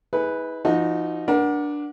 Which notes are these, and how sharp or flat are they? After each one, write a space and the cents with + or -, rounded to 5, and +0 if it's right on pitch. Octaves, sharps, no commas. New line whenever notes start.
E4 -45 G#4 +0 B4 +0
F3 -40 D#4 +0 F#4 -30
D4 +0 A#4 +40 F#5 +0